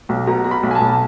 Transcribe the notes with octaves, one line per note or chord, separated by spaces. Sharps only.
B1
B2 A#5
B2 A#5
B5
B1
G#5
A5
B1